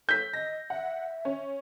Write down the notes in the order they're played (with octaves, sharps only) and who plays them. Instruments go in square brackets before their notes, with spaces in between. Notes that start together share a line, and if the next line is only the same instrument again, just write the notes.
[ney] A4 [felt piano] G6 B6
[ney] D#5 [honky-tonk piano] A#6
[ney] E5 [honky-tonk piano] F#5
[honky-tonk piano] C#4